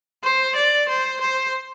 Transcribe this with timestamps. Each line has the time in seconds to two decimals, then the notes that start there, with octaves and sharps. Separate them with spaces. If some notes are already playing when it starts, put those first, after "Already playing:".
0.24 C5
0.56 D5
0.89 C5
1.21 C5